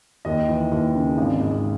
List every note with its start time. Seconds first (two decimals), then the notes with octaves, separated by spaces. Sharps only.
0.25 D#2 D#5
0.48 E3
0.71 D#2
0.95 C#3
1.18 G#1
1.41 G#2